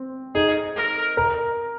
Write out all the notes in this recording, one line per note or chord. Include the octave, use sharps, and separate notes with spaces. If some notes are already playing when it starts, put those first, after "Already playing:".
Already playing: C4
D#4 G#4
A#4
A#4